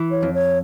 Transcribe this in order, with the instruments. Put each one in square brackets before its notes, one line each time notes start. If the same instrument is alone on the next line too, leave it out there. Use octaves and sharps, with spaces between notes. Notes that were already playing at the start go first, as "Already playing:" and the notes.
Already playing: [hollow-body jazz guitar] E3
[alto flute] C#5
[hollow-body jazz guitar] F2
[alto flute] C#5